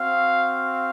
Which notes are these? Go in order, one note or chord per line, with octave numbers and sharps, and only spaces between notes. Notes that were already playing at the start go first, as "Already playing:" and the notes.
Already playing: C4 F#4 F5
F5